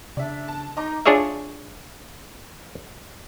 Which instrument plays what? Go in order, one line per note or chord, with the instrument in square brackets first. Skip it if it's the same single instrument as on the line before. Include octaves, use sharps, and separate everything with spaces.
[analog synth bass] C#3 [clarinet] D4 [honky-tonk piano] D5 E5
[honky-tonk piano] A5
[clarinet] D#4 [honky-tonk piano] D#5 A#5 D6
[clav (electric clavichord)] D4 F4 G#4 C#5 D5 E5